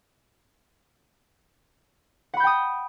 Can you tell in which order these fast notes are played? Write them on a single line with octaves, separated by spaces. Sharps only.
F#5 B5 G6 G5 D#6